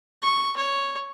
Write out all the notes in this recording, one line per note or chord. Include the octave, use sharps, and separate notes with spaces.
C#6
C#5